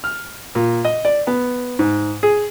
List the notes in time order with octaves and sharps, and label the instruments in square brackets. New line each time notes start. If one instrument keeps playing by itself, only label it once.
[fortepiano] F6
A#2
D#5
D5
B3
G#2
G#4